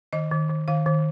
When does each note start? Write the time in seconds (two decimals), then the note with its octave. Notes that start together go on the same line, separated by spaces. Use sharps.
0.13 D#3 D#5
0.31 D#3
0.50 D#3
0.68 D#3 F5
0.86 D#3